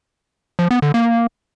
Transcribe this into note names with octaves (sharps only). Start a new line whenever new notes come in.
F3
B3
D3
A#3